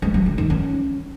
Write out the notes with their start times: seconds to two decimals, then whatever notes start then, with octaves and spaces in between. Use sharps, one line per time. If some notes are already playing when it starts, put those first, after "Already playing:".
0.02 G#3
0.14 F#3
0.26 D3
0.38 D#3
0.50 C#4